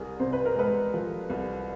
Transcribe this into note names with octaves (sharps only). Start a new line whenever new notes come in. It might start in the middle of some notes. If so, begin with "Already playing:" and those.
Already playing: C2 G#4 A#4
C3 C5
B4
A#4
G#3 A4 B4
F3
C2